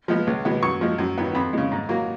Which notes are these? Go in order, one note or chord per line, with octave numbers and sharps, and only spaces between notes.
F3 G#3 B3
C#2
B2 G#3 B3
F#2 C#6
F3 G#3
F#2
D#3 F#3 B3
F2 B5
C#3 G#3
G#2
F#3 A#3